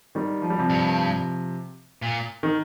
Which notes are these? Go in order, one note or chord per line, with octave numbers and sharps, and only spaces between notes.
D#3 G3
F3
G3
C3 F3
G2
A#2
D#3